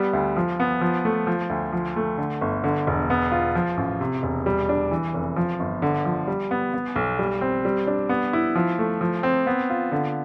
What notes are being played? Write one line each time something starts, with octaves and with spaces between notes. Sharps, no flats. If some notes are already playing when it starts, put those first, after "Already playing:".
Already playing: G3 B3
D2
F3
B3
F3
A3
F3
D2
F3
A3
D3
G1
D3
E1
B3
F4
F3
A1
C3
E1
G3
D4
E3
F1
F3
G1
D3
F3
G3
B3
B3
B1
G3
C4
G3
D4
B3
E4
F3
A3
F3
C4
B3
F4
D3